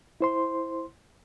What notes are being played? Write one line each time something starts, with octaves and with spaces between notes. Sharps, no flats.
E4 C5 C6